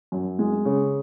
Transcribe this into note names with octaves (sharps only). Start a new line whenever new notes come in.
F#2
G#3
C#3